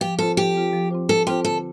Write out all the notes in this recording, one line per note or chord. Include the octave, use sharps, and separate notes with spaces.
F3 G4
C4 F4 A4 C5
F3 G4
C4 F4 C5
F3
C4 F4 C5
F3 A4
C4 F4 G4 C5
D3 A4